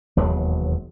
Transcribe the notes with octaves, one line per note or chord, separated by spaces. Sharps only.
E1 D#2 F#3 G#3